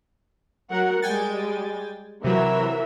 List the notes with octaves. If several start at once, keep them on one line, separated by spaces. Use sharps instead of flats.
F#3 A#4 F#5
G3 G#3 G5 G#5 A6
C3 E3 F#3 A#4 E5